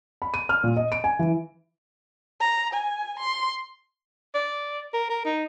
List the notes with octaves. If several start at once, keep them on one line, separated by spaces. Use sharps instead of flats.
B5
D#7
F6
A#2
D#5
D7
G#5
E3
A#5
G#5
C6
D5
A#4
A#4
D#4